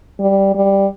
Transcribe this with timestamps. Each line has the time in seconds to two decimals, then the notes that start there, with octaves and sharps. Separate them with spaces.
0.20 G3
0.55 G3